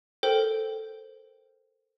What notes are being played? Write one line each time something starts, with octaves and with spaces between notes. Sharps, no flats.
A4 A#4 C5 G5